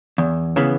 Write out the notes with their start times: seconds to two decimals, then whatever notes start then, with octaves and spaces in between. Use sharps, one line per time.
0.18 E2
0.56 C#3 E3 B3